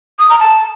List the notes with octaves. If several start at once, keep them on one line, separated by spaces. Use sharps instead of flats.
D#6
A#5
A5